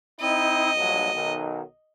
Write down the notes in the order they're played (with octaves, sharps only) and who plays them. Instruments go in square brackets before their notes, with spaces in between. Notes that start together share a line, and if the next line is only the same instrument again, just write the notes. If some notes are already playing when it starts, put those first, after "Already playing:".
[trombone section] C4 D#4 E4 [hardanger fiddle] D#5
[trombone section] A#1 G2 F#3
B1 D#3 F#3